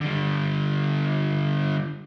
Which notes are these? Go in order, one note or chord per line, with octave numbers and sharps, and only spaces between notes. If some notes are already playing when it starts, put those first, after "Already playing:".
D3 G3